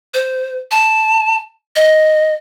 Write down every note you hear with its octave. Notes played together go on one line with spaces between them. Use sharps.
C5
A5
D#5